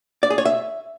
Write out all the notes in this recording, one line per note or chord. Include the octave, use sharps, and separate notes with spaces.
D5
G#4
C#5
E5